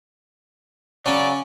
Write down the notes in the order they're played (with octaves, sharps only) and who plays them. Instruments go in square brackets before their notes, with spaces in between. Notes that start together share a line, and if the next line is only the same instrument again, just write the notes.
[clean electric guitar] C#3 F#3 [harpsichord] C#4 [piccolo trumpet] D5